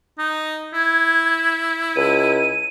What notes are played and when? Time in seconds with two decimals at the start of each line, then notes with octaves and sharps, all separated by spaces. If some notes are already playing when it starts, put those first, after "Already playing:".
0.19 D#4
0.74 E4 G#6
1.96 C#2 D#7